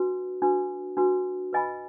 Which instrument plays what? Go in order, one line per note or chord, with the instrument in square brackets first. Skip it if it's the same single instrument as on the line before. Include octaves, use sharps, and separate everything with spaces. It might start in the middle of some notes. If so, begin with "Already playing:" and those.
Already playing: [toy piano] D4 F#4 B4
D4 F#4 B4
D4 F#4 B4
B4 D#5 G#5 B5